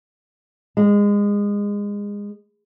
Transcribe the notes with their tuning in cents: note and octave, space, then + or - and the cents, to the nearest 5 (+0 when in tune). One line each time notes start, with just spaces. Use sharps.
G#3 -25